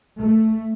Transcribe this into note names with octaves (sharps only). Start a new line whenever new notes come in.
A3